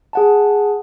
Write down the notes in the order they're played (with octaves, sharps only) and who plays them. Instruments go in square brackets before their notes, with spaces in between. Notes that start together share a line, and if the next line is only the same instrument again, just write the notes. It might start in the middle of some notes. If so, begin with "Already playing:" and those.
[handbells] G#4 F#5 A5